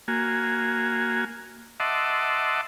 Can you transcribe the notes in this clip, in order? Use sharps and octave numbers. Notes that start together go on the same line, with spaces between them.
A#3 F#4 G#5
D#5 E5 F#5 A5 C6 D6